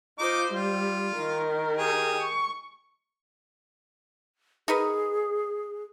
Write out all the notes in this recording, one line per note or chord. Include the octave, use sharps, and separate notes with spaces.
D#4 F4 C5 D6
G3 F4
D#3 A#4
G4 G#4
C#6
D#4 G#4 A#4 B4